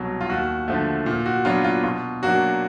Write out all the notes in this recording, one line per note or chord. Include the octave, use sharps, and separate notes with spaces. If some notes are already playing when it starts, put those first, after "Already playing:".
Already playing: C2 B2 F#3
F4
D#2 F#4
D3 F3 A3
A#2
F#4
F#3 B3 D4 F4
F4
B2 F4
F#3 A#3 D4 F#4